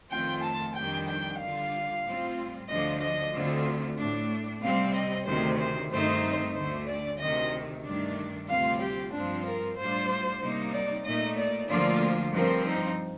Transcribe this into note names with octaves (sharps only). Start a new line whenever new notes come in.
F2 D#3 A3 C4 F4 G5
A5
F2 D#3 G3 D4 G5
G5
D3 G3 D4 F4 F5
A2 G3 C4 F4
D2 D3 F3 A3 D4 D#5
D#5
D2 D3 A3 C4 F4
A2 A3 D4
C3 G3 C4 F5
D#5
D2 C3 D#3 C5
C5
G2 D#3 A3 C4 D#4 C5
D2 D3 A3 C5
D5
D2 C3 D#3 D#5
G2 D#3 A3 D4
D2 C3 G3 C4 F4 F5
G4
G2 F3 C4 D4 F4
A#4
A2 G3 D4 F4 C5
C3 G3 A#3 D#4
D5
A#2 A3 D#4 D#5
D5
D2 D3 F3 A#3 F4 D5
G2 F3 C4 A#4
D#4